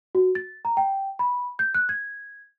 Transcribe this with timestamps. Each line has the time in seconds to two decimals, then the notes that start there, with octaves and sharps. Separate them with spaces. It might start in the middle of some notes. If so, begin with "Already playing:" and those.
0.15 F#4
0.35 A6
0.65 A#5
0.77 G5
1.19 B5
1.59 G6
1.75 F#6
1.89 G#6